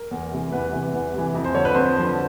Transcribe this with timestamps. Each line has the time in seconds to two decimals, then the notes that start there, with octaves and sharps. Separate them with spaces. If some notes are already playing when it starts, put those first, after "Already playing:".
Already playing: A#4
0.11 E2
0.31 C3 E3
0.52 E2 B4
0.72 C3 E3
0.93 E2
1.14 C3 E3
1.34 F2
1.44 C5
1.54 D3 F3 C#5
1.65 B4
1.75 F2 C5
1.96 D3 F3